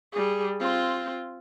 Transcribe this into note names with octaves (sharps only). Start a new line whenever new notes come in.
G3 G#4
C4 F4